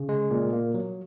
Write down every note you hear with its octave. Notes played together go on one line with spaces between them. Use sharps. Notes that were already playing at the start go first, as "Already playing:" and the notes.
Already playing: C#3
G#3
A#2
A#3
F#3